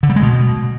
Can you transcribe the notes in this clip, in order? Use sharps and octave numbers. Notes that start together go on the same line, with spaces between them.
D3
G3
G#3
B2